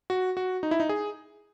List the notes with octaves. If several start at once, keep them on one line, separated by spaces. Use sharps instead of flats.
F#4
F#4
D#4
E4
D#4
G#4